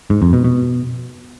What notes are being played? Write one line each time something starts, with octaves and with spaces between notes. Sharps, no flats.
G#2
F2
B2
B2